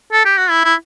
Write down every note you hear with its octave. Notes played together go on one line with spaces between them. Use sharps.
A4
G4
F#4
E4
E4